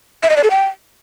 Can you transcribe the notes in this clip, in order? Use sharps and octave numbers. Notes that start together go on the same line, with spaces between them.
E5
D#5
D5
A4
G5